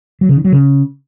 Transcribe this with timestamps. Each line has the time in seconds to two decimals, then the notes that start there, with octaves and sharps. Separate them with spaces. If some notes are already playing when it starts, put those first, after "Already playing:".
0.21 F#3
0.29 C#3
0.37 D#3
0.45 F#3
0.52 C#3